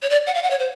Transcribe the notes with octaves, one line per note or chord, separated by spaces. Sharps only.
C#5
D5
F#5
F5
F#5
C#5
C5